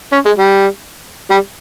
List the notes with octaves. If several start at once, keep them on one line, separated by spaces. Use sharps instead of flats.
C#4
G#3
G3
G3